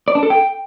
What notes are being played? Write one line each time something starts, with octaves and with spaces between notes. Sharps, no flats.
D5
D4
A4
G5